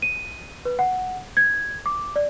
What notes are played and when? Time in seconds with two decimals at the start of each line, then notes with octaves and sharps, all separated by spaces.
0.02 D#7
0.65 B4
0.79 F#5
1.37 G#6
1.86 D6
2.16 D5